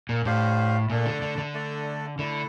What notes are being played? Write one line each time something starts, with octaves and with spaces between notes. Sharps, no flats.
A#2
A2 D4 G4 C5 F5
A#2 A3 D4 A4 D5
D3
D3
D3
A3 D4 A4 D5
D3 A3 E4 A4